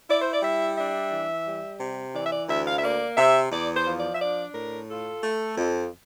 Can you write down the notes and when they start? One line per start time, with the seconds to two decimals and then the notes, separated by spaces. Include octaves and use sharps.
0.09 E4 D5
0.21 C5
0.32 D5
0.43 G3 E5
0.77 D4 E5
1.12 E3
1.46 G3
1.80 C3
2.15 E3 D5
2.25 E5
2.32 D5
2.49 D2 E5
2.67 F5
2.78 E5
2.83 A#3 D5
3.17 C3 E5
3.52 E2 D5
3.75 C5
3.86 F3
3.98 D5
4.15 E5
4.20 D4 D5
4.55 A2 A#4
4.89 F4 A4
5.23 A3
5.58 F2